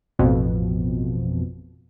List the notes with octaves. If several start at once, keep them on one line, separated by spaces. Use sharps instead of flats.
A1 F2 B2